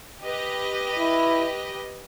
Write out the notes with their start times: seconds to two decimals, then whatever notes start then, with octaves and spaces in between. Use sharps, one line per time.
0.21 G4 B4 D#5
0.99 E4